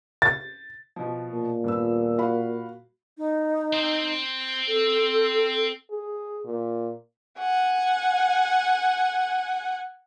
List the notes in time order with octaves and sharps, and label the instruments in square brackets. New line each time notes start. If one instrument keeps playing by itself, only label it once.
[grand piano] A6
[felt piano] B2 F3
[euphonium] A#2
[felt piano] D#1 B3 E6
F#4 F5 B5
[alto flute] D#4
[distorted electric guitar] C4 C5
[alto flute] A4
[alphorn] G#4
A#2
[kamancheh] F#5 G#5